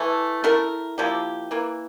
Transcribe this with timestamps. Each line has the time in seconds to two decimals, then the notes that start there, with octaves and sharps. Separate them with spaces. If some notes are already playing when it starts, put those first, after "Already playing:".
Already playing: E3 A3 E4
0.44 A3 E4 A#4
0.98 F3 A#3 E4 G4
1.51 E3 A#3 E4